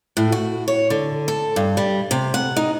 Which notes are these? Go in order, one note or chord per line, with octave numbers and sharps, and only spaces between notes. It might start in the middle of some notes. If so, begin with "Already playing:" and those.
A2
F#4
C#5
D3
A4
G2
G3
C3
F#5
D#4